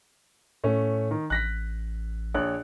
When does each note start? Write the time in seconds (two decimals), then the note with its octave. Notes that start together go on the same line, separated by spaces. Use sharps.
0.64 A2 A3 C#4
1.11 D#3
1.30 A1 F#6 A#6 B6
2.35 A#1 C#5 F#6